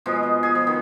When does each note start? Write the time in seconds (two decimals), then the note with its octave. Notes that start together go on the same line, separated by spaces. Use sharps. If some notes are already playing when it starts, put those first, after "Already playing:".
0.06 B2 F3 G#3
0.23 D#5
0.43 G#4
0.55 F3
0.67 D#3